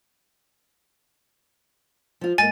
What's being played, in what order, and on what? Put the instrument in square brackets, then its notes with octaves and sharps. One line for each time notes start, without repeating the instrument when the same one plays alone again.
[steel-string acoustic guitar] F3 F4
[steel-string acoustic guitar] G#2 A#3 [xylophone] G#5 A6